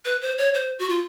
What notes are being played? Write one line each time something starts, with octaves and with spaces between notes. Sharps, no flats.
B4
C5
C#5
C5
F#4
F4